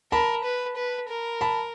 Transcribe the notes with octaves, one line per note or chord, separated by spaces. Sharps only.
A#4 A5 B5
B4
B4
A#4
A5 B5